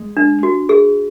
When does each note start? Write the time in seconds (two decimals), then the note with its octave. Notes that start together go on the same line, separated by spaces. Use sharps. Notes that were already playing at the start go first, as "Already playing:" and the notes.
Already playing: G#3
0.17 D4
0.43 F#4
0.69 G#4